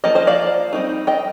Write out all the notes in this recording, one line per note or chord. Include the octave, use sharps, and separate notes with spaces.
F3 A#3 D#5
C5 D#5
D5 F5
G3 C4 D#4
D#5 G5